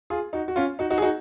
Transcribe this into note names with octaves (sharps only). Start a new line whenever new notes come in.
F4 G#4
D#4 F#4
F#4
C#4 F4
D#4 F#4
D#4 F#4
G#4
D#4 F#4